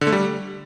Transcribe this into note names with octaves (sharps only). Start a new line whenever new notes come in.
D3
A3
G3